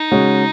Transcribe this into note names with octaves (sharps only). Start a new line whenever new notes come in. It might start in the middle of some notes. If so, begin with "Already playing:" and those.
Already playing: D#4
C#3 G#3 C#4 F#4